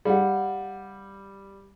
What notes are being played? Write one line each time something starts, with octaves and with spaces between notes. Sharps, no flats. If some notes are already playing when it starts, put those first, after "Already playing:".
G3 F5 F#5